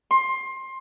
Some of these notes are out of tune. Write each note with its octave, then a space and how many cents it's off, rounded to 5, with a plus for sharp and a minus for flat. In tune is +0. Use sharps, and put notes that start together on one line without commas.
C6 +20